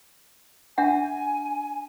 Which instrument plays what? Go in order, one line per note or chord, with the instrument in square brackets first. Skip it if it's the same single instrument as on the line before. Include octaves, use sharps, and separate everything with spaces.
[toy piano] D4 E5 F#5 [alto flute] G#5